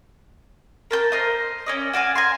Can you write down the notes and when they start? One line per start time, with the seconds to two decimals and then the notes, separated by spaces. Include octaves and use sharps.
0.91 A#4 A5 G6
1.12 A#4 C5 D#5
1.66 C#4 D5 D#5
1.93 F#4 D5 F5 G#5
2.15 G#5 A#5 C6